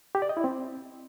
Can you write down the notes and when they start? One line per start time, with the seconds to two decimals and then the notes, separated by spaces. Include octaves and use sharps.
0.15 G4
0.22 D5
0.29 D#5
0.37 E4
0.44 C4